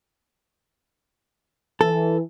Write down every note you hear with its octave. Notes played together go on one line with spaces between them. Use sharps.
E3 A4